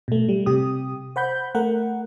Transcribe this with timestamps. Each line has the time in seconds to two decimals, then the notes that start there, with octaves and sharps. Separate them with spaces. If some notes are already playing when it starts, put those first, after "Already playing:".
0.08 B2 A3
0.29 G3
0.46 C3 G4 D#6
1.16 C5 F#5 B5 G6
1.55 A3 A#4 F#5